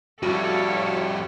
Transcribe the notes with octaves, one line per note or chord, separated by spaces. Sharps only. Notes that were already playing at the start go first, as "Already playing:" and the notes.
F2 G3 E4 F#4 A4 C#5 F5